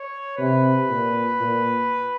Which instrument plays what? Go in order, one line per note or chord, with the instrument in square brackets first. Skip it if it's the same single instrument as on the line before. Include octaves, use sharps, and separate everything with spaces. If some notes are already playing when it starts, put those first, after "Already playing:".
Already playing: [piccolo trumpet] C#5
[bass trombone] C3 [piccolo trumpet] B4
[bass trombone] A#2
A#2